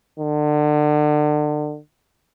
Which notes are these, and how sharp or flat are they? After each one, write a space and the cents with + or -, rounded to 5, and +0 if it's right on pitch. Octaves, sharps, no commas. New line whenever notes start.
D3 +30